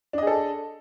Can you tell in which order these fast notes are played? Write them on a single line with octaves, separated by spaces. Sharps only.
D4 D#5 G#4 A4